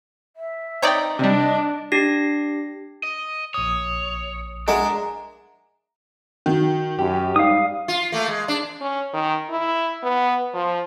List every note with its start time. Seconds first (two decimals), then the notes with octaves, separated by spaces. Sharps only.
0.36 E5
0.82 C4 D#4 C#5 D5 G5
1.19 C3 G3 D4 D#5
1.92 D4 G4 A#6
3.03 D#5
3.54 A#1 C#5 D#6
4.68 G#3 D4 A#4 E5 F#5
6.46 D#3 F#4
6.99 F#2 G4
7.36 G#2 G3 D#4 F5 D#6
7.88 F4
8.12 A3 A#3
8.28 G#3
8.48 D4
8.81 C#4
9.14 D#3
9.50 E4
10.03 B3
10.54 F3